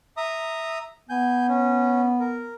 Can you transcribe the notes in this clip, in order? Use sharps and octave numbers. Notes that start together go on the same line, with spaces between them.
E5 A#5 D#6
B3 G#5 G6
C#4
A#4